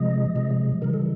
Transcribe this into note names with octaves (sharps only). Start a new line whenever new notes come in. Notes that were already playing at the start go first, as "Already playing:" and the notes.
Already playing: C3 F3 G#3 D#5
C3 F3 G#3
C#3 E3 G3 A#4
A4